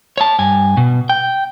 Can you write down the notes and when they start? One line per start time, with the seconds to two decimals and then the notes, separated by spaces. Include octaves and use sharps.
0.17 C#5 A5
0.39 G2 G#5
0.77 B2
1.09 G5